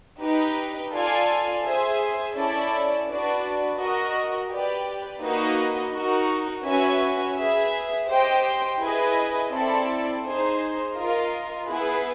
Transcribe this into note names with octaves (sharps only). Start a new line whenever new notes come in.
D#4 G4 B4
F4 A4 D5 F5 G#5
G#4 C5 E5 G#5
C#4 E4 A4 D5
D4 F#4 B4 D5
F#4 A#4 D#5
G4 B4 D5
A#3 D#4 F#4 B4 D#5
D#4 F#4 A#4
C#4 F#4 B4 E5 G#5
G#4 B4 E5
G4 C5 D#5 G5
E4 G#4 B4 D#5 G#5
C4 E4 A4 D5
D#4 G#4 C5
F4 A#4 D#5
B3 E4 G#4 B4